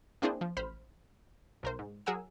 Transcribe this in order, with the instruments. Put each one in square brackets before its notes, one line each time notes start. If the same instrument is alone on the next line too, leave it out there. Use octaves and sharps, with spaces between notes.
[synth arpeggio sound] A#3 C4 D4 E4 G#4 C5
F3
A1 C5 B5 F6 B6
B1 A#4 C5
G#2
F#3 G#4 A#4 F#5 G#5 E6